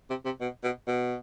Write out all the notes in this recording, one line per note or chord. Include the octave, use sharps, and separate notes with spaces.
C3
C3
B2
B2
B2